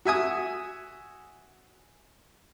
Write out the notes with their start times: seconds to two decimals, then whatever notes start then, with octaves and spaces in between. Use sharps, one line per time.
0.05 F#4 E5 G#5 D#6